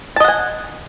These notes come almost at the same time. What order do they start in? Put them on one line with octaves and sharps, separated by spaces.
A5 D#5 F#5 G#5